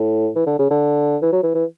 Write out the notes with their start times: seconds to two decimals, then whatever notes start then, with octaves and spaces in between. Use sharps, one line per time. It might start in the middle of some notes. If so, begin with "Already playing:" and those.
Already playing: A2
0.36 E3
0.47 D3
0.59 C#3
0.71 D3
1.22 E3
1.32 F#3
1.43 E3
1.55 E3